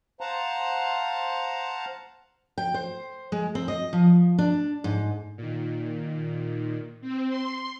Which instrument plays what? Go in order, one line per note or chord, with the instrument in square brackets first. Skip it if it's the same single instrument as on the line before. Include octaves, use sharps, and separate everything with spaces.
[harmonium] C5 F5 F#5 A5 A#5
[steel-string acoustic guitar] G5
C5
G#3
C4
D#5
F3
D4
G#2
[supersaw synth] A#2 D#3
[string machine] C4
C6